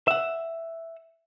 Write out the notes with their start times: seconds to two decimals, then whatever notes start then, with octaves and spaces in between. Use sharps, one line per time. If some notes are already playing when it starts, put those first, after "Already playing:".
0.08 E5 F#5